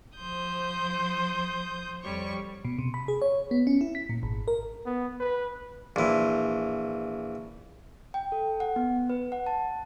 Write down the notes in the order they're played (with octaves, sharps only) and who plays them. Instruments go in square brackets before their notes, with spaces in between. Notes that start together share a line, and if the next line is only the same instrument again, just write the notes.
[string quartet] F3 C5 D#6 G6
F2 G3 C#5 C#6
[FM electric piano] B2
C3
B5
G#4
C#5
B3
C#4
E4
B6
A#2
G#1
A#4
[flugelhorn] B3
B4
[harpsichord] A#1 E3
[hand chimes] G5
A4
F#5
B3
B4
F#5
A5